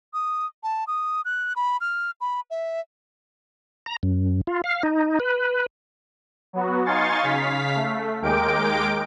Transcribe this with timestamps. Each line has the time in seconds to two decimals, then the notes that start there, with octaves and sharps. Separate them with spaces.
0.14 D#6
0.63 A5
0.87 D#6
1.25 F#6
1.56 B5
1.81 F6
2.21 B5
2.50 E5
3.86 A#5
4.03 F#2
4.47 F4
4.64 F5
4.83 D#4
5.20 B4
6.53 F#3 B3 F#4
6.86 D#4 F5 G#5 C6 C#6 A6
7.23 C#3 F5 B6
7.76 A3
8.22 D#2 G#3 A#4 G5 D6 D7